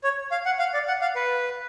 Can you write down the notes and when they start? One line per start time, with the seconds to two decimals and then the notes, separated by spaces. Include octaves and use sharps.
0.04 C#5
0.32 F5
0.46 F#5
0.59 F5
0.74 D5
0.88 F#5
1.02 F5
1.16 B4